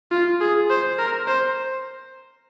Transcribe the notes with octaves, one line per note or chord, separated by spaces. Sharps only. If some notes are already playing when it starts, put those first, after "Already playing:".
F4
G#4
C5
A#4
C5